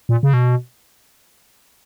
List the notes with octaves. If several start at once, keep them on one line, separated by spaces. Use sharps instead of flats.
A#2
C#3
B2